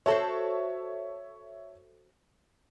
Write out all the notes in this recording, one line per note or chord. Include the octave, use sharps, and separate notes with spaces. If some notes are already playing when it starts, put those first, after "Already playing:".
F#4 A4 C5 C#5 E5 A5